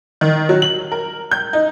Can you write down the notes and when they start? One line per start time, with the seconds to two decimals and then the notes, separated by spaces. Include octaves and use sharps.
0.21 D#3
0.49 F#3
0.62 F#7
0.92 A#4
1.31 G6
1.53 D#4